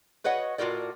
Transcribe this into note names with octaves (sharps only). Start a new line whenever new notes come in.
F#4 B4 C#5 D#5 F#5
A2 F4 F#4 A#4 D5